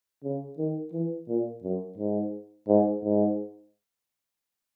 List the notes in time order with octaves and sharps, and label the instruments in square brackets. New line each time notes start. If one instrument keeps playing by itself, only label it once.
[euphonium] C#3
D#3
E3
A#2
F#2
G#2
G#2
G#2